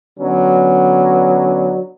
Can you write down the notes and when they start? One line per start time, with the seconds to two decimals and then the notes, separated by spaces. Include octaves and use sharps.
0.19 D3 F#3 B3 C#4 D4